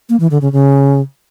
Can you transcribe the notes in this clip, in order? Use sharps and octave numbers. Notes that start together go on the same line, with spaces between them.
A#3
E3
D3
C#3
C#3